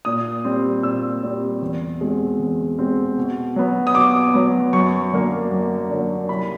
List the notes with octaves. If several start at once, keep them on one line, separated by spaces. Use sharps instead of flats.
A#2 D#6
G3 C4
A#2 E6
G3 C4
E2
B2 G#3 C4
E2
B2 G#3 C4
B2
F#3 B3
D#6
B2 D6
F#3 B3
F#2 C#6
D3 F#3 A#3
F#2
D3 F#3 A#3
C2 B5